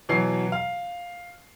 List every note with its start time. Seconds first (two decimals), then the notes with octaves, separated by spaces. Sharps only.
0.09 B2 E3 F#3 C7
0.52 F5